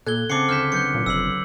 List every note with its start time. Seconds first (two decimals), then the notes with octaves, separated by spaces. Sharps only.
0.06 A#2 A4 F#6 G#6 G7
0.30 C#3 C4 F#5 A5 D6 F#6 C7 C#7
0.49 D2 F6 G6 B6 E7
0.72 F#3 B3 F#6 G6 C#7
0.94 A#2
1.06 F1 E6 C7 F#7